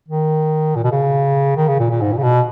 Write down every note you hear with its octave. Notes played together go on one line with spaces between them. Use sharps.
D#3
A#2
B2
C#3
D#3
C#3
A#2
A#2
G#2
A#2
C#3
B2